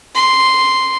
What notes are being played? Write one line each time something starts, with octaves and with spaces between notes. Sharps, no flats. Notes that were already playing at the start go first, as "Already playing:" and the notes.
C6